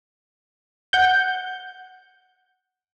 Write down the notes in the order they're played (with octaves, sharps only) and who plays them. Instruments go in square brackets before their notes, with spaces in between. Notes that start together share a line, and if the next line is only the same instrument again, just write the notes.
[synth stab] F#5 G6